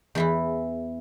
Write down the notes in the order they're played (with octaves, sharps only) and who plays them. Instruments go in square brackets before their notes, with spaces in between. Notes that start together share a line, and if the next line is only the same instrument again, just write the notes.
[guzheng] E2 E3 E4